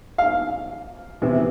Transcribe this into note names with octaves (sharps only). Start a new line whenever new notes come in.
F5
C3 E3 B3 E4